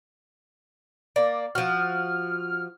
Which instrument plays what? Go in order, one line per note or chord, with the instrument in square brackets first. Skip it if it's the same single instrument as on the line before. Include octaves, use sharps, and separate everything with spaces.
[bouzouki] A#3 [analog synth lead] D5
[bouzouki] F3 F#4 [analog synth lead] F6